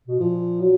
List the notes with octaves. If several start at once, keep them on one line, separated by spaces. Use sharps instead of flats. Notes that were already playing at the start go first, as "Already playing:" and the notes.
B2
A#2 F3
F#3